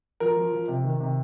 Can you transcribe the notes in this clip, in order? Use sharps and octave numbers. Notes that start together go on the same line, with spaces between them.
F3 A#4
F3
F3
C3
D#3
C3